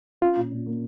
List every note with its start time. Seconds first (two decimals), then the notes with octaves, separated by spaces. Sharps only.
0.21 C#4 F4
0.36 A#2
0.52 A#2
0.66 A#3